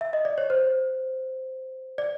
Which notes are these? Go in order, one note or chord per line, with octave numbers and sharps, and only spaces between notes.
E5
D#5
D5
C#5
C5
D5